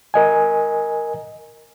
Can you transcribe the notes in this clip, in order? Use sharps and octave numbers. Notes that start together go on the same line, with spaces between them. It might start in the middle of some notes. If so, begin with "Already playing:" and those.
A#4 D#5 G#5